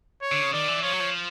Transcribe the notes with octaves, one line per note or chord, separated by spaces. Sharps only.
C#5
D3
C#3
D#3 D5
E3
F3 C#5
F#3
F3